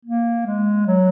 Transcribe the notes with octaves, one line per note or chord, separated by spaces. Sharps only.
A#3
G#3
F#3